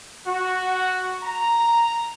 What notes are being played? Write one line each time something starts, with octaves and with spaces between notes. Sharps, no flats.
F#4
A#5